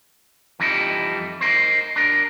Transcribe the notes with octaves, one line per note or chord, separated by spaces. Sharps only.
F2 E3 G3 D#4 E4
D#4 A#4 C5
D4 A#4